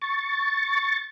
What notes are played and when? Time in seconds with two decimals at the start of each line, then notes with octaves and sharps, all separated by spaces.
0.02 C#6 A6